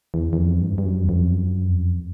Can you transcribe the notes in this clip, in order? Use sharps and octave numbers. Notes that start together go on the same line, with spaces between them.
E2
E2
F2
G2
G2
F#2
E2
F2
F#2
F2